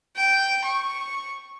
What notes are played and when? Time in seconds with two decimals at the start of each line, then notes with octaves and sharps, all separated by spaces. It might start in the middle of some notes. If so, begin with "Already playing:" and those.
0.16 G5
0.65 C#6